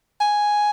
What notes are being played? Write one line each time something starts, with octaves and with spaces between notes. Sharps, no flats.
G#5